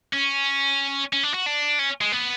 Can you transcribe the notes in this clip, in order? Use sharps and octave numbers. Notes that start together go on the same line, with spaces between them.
C#4
C#4
D4
F#4
D4
C#4
G#3
B3